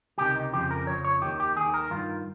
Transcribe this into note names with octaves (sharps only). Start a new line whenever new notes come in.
C#2 C3 D#3 G4
D#4
F2 C#3 F3 G4
A#4
F2 C#3 F3 C#5
C#5
D#2 D#3 G4
G4
D#2 D#3 G#4
A#4
G2 D#3 F4